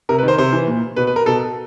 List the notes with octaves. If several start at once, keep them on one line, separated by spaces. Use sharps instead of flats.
C3 A#4
B4
D#3 C5
C3 C5
E3
A#2
B2 B4
B4
A#4
B2 A4